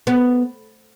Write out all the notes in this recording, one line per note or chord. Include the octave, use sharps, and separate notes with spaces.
B3